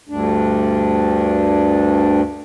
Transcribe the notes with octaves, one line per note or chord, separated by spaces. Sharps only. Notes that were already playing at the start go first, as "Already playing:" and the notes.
D2 G2 D4